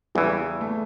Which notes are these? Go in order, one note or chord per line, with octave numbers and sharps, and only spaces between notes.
E2 C#3 E3 G3
A3